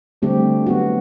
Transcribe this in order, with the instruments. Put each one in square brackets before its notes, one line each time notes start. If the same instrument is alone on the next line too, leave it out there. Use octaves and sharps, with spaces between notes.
[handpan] D3 G3 C4 G4 [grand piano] A3
[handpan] F#3 B3 F#4